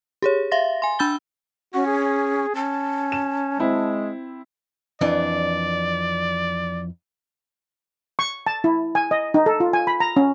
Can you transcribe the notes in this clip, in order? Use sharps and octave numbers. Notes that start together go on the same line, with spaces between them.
G4 G#4 C#5
E5 F5 C6 A6 A#6
G#5 C6
D4 B5 E6 G6 A6 G7
C#4 F#4
G#4
C#4 A5
E7
G#3 C4 E4
F2 E3 D4 D5
C#6
A5
E4
G#5
D#5
D#4
A4
F4
G#5
B5
A#5
C#4